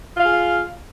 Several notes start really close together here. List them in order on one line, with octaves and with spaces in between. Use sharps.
F4 F5 G#4